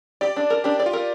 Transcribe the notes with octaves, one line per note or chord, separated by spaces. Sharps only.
G4 D5
D4
A#4
D4 G4
D5
F4
A#4